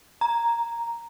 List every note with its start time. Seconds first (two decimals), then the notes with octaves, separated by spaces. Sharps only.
0.21 A#5